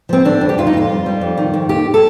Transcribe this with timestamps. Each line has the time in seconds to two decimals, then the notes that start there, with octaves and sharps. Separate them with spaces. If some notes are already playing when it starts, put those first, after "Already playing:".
0.09 F3 C4
0.25 D3 D4
0.41 F2
0.49 G4
0.58 F2 F4
0.67 D#4
0.73 F2 F4
0.89 G3
1.06 G3
1.21 F2
1.38 D#3
1.54 F2
1.69 D#2 G4
1.94 A4